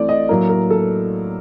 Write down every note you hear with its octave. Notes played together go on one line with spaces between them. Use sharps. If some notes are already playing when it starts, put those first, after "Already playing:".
Already playing: E3 A3 C4 D5
D#5
A2 F#3 A#3 A#4
A#4
A4